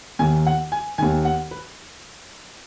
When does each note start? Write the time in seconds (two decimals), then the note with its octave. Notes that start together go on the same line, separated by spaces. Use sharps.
0.19 D#2 D#3 G#5
0.46 F#5
0.72 G#5
0.98 D#2 D#3 G#5
1.25 F#5
1.51 B4